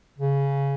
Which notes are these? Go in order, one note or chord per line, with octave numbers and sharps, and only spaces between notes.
C#3